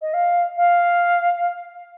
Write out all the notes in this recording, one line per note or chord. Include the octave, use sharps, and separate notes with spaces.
D#5
F5
F5